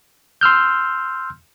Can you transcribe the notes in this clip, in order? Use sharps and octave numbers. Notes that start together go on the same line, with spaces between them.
C6 E6 F6 G6